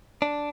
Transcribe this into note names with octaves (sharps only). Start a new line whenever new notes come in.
D4